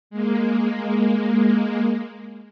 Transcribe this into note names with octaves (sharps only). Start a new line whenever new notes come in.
G#3 A#3